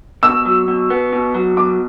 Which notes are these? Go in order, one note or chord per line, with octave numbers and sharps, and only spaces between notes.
B2 E6
F#3
B2
B3
B2
F#3
B2 D6